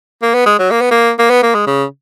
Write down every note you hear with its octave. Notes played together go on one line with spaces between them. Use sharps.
A#3
B3
G#3
F#3
A#3
B3
A#3
A#3
B3
A#3
G#3
C#3